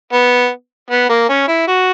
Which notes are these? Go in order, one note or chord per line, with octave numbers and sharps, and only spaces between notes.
B3
B3
A#3
C#4
E4
F#4